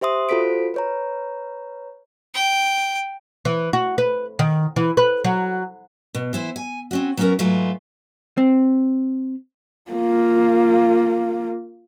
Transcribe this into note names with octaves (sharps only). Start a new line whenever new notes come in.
G4 C5 E5 C6 D#6
F4 F#4 A4 C5 B6 D7
B4 C#5 A#5
G5
E3
F#4
B4
D#3
E3
B4
F#3
B2
E3 E4 C5
G#5
C4 C#4 F#4
F#3 B3 C#4 D#4 F#4 A#4
G#2 F#3 A3 B3 F4 G#5
C4
A#3 F4